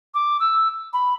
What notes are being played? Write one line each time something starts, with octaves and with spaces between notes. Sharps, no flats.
D6
E6
B5